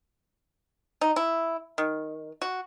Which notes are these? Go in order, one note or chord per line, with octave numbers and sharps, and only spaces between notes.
D#4
E4
D#3
F#4